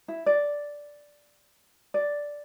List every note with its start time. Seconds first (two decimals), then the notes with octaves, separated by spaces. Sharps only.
0.08 E4
0.26 D5
1.94 D5